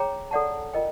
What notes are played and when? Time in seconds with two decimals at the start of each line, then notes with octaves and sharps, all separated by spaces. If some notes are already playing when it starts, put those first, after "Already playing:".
Already playing: G#4 C#5 G5 A#5
0.31 A4 D5 F#5 A5
0.73 F4 A#4 D#5 G5